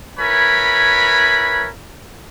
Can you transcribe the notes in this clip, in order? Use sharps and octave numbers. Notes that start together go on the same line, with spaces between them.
E4 A#4 B4 C#5 G#5 B5